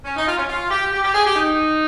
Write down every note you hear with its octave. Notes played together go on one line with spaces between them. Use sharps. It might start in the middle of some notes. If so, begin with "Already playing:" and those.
C#4
D#4
F4
C#4
F4
G4
G4
G4
G#4
G4
D#4